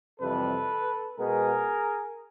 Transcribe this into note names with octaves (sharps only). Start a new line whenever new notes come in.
F2 C3 E3 G3 A4 B4
B2 G#3 B3 G#4 A#4